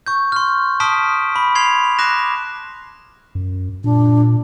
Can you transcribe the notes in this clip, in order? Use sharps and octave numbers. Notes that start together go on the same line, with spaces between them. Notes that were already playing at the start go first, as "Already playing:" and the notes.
C#6 G6
C6 F6
A5 C6 D#6 F6 B6 D7
B5
C6 G#6 C7 F7
D6 F#6 A#6 E7
F#2
A#2 D4